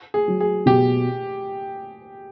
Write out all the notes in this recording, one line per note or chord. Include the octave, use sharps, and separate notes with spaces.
G#4
F#3
G#4
B2 G4